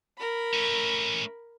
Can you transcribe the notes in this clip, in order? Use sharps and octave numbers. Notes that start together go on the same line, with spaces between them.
A#4 B5
A3 C#4